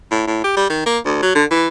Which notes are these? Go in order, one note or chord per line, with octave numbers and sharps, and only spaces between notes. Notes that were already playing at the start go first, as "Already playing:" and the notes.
A2
A2
G4
G3
D#3
A#3
D2
F#3
D3
E3